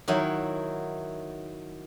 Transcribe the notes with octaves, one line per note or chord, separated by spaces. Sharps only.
D#3 F#3 E4